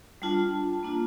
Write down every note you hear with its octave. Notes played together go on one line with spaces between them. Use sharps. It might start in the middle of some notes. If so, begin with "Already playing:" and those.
G3 D4 F4 A5
A#3 D4 F4